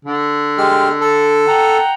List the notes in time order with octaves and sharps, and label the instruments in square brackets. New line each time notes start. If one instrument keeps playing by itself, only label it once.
[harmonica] D3
[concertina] G#3 G4 F6
A4
[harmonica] F#5 G5 A#5